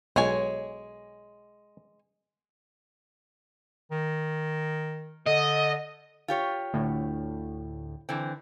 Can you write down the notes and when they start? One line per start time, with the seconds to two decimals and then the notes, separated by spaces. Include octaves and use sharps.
0.16 B1 G#3 C#5 G#5
3.91 D#3
5.26 D3 D#5
6.28 F4 G4 C#5
6.73 D2 A2
8.09 D3 E3 C4